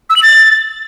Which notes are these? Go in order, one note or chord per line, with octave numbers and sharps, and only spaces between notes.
E6
F#7
A6